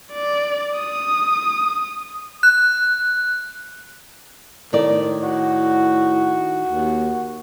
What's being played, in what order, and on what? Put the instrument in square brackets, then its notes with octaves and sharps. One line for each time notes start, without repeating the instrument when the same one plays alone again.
[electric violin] D5
D#6
[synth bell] F#6
[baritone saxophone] A2 [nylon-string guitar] D#3 D5
[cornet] F#4
[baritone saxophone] D#2